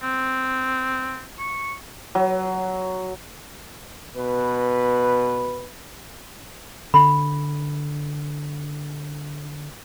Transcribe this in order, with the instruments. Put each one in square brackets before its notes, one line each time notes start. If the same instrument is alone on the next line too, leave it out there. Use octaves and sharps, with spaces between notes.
[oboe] C4
C#6
[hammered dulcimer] F#3
[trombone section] B2 B4
[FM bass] D3 [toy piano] B5